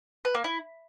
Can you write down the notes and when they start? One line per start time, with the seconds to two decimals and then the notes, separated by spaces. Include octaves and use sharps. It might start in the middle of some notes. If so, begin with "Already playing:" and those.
0.25 B4
0.35 A#3
0.44 E4